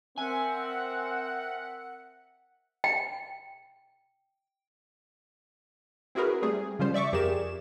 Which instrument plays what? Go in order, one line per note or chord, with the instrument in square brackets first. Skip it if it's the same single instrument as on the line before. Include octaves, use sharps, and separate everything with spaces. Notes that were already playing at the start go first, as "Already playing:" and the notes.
[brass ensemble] C4 [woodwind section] A#4 E5 F#5 [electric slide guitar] G#5
[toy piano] G5
[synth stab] C4 E4 F#4 G#4 A#4 B4
G3 A3 C4 G#4
C#3 F3 G3 C#4 C5
D5 E5 C#6 D6
F2 G4 G#4 A#4 D5 E7